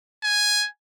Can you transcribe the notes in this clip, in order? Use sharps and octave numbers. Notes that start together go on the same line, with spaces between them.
G#5